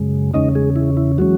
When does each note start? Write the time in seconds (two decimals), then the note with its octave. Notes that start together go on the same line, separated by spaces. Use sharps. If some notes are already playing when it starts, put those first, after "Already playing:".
Already playing: F#2 C#3 G#3
0.34 E2 C#3 G#3 C#4 D#4 D#5
0.55 G#3 G#4
0.76 E4
0.97 E4
1.18 E3 F#3 G#3 C#4 F#4